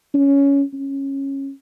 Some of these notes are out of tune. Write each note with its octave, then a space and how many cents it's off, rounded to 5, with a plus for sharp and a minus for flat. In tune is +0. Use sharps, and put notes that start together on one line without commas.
C#4 +10
C#4 -15